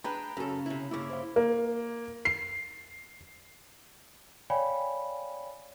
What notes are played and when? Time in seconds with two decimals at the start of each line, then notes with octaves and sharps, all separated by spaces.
0.04 G#3 D4 B4 G5 A#5 B5
0.37 F#2 C#3 A4
0.66 C3 E4
0.91 G2 C#3 A#3 E4 D6
1.10 C5 F5
1.36 A#3
2.25 C7
4.50 C#5 D5 F5 G5 G#5 B5